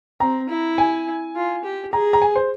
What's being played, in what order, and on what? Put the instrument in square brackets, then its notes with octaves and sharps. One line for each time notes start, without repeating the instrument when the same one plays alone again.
[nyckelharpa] C4 [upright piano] A#5
[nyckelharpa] E4
[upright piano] G#5
[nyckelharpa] F4
G4
[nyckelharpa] G#4 [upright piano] A#5
[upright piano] A#5
G#5
C5